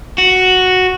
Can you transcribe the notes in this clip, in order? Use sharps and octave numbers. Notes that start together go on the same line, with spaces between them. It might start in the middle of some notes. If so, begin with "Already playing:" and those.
F#4